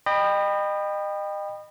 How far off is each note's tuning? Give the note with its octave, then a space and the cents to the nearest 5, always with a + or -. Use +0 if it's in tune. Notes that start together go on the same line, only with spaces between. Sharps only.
D#5 -30 G5 +15 B5 +0